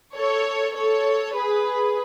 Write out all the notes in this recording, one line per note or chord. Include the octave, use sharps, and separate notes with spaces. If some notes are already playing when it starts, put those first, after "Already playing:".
A4 C#5
A4 C#5
G#4 B4